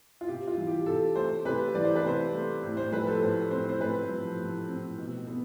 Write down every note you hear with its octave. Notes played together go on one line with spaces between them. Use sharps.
F4
C3 G4
F4
E3
G4
C3 A4
A3 C5
C3 B4
E3 D5
C5
B4
C3 C5
A3
A2
C5
F3 B4
A4
A2 C5
C4 C5
C5
A2 B4
F3
A2
C4
B2
B3